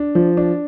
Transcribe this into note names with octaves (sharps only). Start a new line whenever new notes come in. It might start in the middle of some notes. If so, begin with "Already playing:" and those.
Already playing: D4
F3
D4